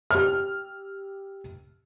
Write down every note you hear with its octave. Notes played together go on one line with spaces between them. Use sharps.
G4 F6